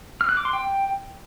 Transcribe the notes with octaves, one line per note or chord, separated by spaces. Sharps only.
F6
F#6
D6
C6
G5